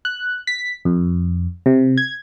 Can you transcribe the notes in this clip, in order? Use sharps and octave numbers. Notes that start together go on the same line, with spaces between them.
F#6
B6
F2
C3
G#6